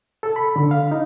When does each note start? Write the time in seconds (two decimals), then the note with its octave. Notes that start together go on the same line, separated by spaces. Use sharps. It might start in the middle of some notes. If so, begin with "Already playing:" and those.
0.23 A4
0.36 B5
0.56 D3
0.71 F5
0.91 D#4